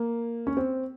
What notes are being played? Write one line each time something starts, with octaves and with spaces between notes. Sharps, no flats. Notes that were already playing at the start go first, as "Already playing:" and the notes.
Already playing: A#3
C#4
C4